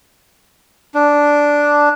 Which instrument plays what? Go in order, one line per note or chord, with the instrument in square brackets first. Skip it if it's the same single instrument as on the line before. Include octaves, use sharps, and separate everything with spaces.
[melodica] D4